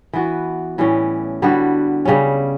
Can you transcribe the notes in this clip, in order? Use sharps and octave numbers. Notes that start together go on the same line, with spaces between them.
E3 B3 F#4
A2 E3 G3 C#4
D3 G3 B3 F#4
C#3 G3 C#4